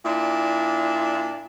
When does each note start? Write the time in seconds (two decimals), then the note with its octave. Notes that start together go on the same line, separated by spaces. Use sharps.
0.05 A#2 D4 E4